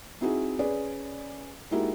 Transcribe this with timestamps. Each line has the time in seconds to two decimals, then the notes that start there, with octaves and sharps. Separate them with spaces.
0.21 C4 D#4 E4 F#4 G#4
0.59 C#4 G#4 B4 D5
1.71 G#3 A#3 D#4 E4 F#4 G4